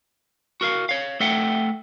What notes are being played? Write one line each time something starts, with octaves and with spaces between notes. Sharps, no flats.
F#4 A#4 F5
C#5 F5
A3 A4 E5 F#5 G5